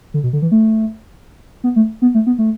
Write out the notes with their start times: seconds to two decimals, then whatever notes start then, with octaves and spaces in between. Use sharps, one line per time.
0.14 D3
0.24 B2
0.33 D3
0.42 E3
0.52 A3
1.64 B3
1.76 A3
2.02 B3
2.14 A3
2.27 B3
2.39 A3